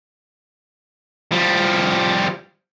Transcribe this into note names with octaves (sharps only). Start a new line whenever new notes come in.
F3 G3